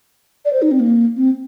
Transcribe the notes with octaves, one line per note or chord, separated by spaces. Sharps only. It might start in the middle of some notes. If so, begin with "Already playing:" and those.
D5
C5
D#4
C4
A#3
C4